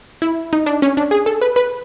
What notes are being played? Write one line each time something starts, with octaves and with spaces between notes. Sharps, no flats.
E4
D#4
D4
C#4
D4
G#4
A4
B4
B4